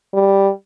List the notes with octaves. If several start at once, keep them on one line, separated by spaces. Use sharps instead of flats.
G3